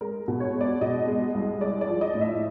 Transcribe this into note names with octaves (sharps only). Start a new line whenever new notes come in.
G#3 A#4
B2
C#5
G#3
D5
B2 D#5
G#3
C2
G#3 D5
D5
F3
D#5
A2
E5